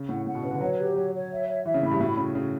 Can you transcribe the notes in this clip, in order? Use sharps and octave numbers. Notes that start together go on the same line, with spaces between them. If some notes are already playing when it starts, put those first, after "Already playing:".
Already playing: C#3
A2 F#5
A2 F#5
B2
C#3 B4
D3
F#3 C#5
G4
F#3 C#5
C#5
E5
C#5
E3 E5
C#3
A2 B5
G2
A2 F#4
C#3 F#4
C#3 F#4